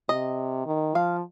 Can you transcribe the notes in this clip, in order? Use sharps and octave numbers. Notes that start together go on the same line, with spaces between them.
C3 D#5
D#3
F3 F5